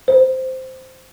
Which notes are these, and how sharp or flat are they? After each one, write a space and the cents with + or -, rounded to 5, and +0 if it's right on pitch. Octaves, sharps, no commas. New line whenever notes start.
C5 -5